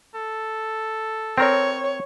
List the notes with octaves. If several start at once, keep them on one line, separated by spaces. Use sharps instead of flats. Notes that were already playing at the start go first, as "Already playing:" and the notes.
A4
C4 A#4 C#5